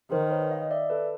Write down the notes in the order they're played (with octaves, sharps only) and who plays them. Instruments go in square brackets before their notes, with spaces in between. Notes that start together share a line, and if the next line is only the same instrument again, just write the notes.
[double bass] D#3 [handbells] A#4 C5
[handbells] B4 C#5
D#5 F5
D5 E5
A4 B4